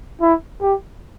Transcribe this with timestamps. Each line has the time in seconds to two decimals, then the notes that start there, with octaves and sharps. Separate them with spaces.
0.21 E4
0.62 G4